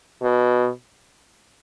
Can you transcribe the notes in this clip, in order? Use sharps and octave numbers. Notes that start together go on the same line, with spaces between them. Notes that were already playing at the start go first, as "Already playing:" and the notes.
B2